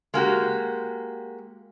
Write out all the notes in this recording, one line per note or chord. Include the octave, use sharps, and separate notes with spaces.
G#3 A#3 F#4 G4